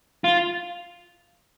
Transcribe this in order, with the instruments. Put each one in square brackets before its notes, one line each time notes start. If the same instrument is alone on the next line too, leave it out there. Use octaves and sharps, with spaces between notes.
[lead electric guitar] F4